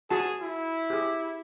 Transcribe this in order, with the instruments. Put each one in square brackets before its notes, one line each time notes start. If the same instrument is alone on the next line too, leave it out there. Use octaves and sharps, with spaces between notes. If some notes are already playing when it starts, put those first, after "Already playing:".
[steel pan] F#4 A5 [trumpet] G#4
[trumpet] E4
[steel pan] G4 G#4